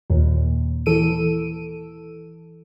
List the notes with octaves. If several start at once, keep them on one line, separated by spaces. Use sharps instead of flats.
D#2 A#2
E3 A4 E6 D7 D#7